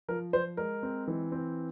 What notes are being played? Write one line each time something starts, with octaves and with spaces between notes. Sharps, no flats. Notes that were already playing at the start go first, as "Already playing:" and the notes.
F3 A#4
F3 C5
G#3 A#4
C4
E3
C4